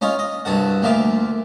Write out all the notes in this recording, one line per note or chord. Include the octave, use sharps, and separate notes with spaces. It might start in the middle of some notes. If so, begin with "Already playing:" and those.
C#4 D#4 F4 C#5
D#5
C2 G2 F#4 A4 F#5
D2 A#2 F4 E5 D6